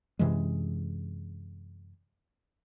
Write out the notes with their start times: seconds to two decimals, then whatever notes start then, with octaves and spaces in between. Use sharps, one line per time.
0.19 F#2 C3 E3 G#3